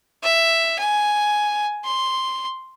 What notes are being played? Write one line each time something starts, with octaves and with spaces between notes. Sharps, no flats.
E5
G#5
C6